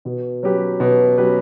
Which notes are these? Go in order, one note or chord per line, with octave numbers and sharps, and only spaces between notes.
B2
F#3 C#4 G4 B4
B2
F#3 C#4 G4 B4